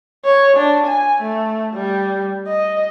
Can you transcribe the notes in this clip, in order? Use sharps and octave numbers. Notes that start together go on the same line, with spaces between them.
C#5
D4
G#5
A3
G3
D#5